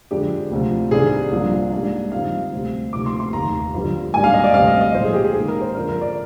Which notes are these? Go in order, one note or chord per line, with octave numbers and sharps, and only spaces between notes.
F2 D3 G#3 D4 G4
D2 C3 F3
C2 C3 D#3 G3 D4 G#4
C2 C3 F3 A#3 D4
G#2 G3 A#3 D4
F2 D3 G3 C4 D#4 F5
D2 C3 G3 C4
D2 C3 F3 A#3 D#4 D6
C6
C6
F1 D#2 D#3 A#5
G1 F2 D3 G3
G#1 G#2 G3 A#3 D4 G#5
F5
D#5
D5
D2 C3 G3 C4 F5
D#5
D#5
A#1 G#2 F3 A#3 C5
G#4
G4
G#4
G#2 D#3 A#3 D#4
A#4
C5
F2 D3 G#3 D4 A#4
A#4
D5